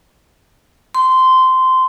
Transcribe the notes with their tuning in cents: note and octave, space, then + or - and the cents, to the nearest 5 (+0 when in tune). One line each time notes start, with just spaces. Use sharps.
C6 -15